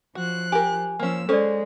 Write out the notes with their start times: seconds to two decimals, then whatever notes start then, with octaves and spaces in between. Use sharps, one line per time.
0.15 F3 F#4 F#6
0.52 G4 A#4 G#5
0.99 F3 A#3 C#4 E6
1.29 G#3 C#4 A4 C5 D5